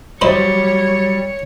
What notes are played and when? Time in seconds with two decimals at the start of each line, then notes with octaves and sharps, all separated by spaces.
0.21 F#3 G3 D#4 E4 C5 C#5